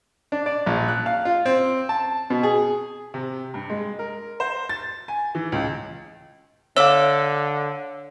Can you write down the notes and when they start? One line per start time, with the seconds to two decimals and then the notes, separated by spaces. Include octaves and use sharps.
0.32 D4
0.46 D5
0.66 A#1
0.88 F#6
1.06 F5
1.25 F4
1.46 C4
1.89 A5
2.30 B2
2.43 G#4
3.14 C3
3.54 G2
3.70 G#3
3.99 A#4
4.40 C5
4.69 A6
5.08 G#5
5.35 E3
5.52 C#2
6.76 D3 C#5 E5 F5 D6